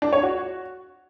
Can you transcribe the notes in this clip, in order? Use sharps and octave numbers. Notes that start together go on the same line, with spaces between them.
D4
C#5
F#4